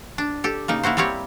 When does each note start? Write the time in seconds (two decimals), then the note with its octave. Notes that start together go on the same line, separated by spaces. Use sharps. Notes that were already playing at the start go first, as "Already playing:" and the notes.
0.18 D4
0.44 G4 A4
0.68 C#3 A#3 D#4
0.83 A#3 E4 F#4 C5
0.97 G3 A#3 C4 G4 C#5